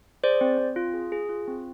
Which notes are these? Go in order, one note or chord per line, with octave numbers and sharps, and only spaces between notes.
G#4 C5 D5
C4
C4
F4
G#4
G#4
F4
C4